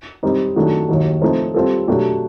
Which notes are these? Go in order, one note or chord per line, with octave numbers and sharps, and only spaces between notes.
G3 C4 D#4
D#3 F#3 A3 D4
D#2 D#3 F#3
F3 A3 C4 D#4
G3 C4 F4 A4
B2 F#3 A3 D4 G4